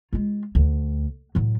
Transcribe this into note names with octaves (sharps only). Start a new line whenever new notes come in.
G#3 F4
D2
A2 F#3